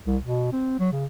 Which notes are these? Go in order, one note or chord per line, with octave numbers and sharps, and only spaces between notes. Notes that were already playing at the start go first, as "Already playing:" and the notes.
C2
B2
C4
F#3
C#3